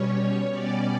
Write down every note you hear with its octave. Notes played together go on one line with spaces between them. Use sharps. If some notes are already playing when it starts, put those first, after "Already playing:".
Already playing: B2 G3 C#4 C#5
B2 G3 C#4 D5